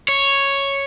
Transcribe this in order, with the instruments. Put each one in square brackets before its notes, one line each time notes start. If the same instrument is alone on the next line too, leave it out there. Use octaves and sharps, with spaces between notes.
[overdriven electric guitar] C#5